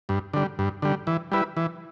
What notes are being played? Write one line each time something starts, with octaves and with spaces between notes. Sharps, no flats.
G2
D3 G3
G2
D3 G3
E3
G3 E4 B4
E3